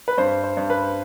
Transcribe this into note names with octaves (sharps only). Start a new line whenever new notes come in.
B4
G2 C5
C5
G2
B4